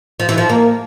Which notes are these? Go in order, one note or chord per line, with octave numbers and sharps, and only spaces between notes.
F3
E3
F3
A#3